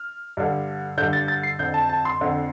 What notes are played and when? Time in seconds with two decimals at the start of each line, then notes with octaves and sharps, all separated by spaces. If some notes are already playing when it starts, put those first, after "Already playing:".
Already playing: F6
0.37 G2 D3
0.98 G2 D3 G6
1.13 A6
1.28 A6
1.43 C7
1.59 F2 D3 G6
1.74 A5
1.89 A5
2.05 C6
2.21 F2 D3